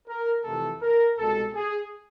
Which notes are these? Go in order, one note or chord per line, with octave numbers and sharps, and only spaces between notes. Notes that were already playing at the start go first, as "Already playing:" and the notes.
A#4
F2 C3 E3 A3 A4
A#4
C2 B2 G#3 A4
G#4